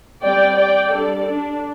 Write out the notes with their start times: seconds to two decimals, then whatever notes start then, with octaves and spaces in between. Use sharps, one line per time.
0.24 G3 C4 D5 G5
0.58 D5 G5
0.92 G3 D4 A4 D5
1.27 D4